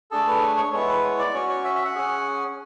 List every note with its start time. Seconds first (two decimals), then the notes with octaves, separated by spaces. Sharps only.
0.11 A3 D4 G#4 A4
0.27 B4
0.42 C#5
0.57 C#5
0.73 G#3 B3 E4 C#5
0.89 B4
1.04 C#5
1.19 D5
1.34 C#4 F#4 C#5
1.49 C#5
1.64 E5
1.75 E5
1.85 F#5
1.95 C#4 G#4